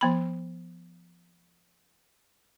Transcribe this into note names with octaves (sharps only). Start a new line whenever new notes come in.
F3 B3 B5